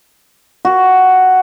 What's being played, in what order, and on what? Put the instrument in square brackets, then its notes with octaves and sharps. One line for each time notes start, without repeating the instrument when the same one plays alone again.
[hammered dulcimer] F#4